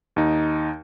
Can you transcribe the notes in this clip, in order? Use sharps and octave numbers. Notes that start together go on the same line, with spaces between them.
D#2 D#4